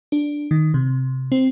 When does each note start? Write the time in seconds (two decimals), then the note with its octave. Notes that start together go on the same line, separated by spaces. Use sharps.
0.12 D4
0.51 D#3
0.74 C3
1.32 C4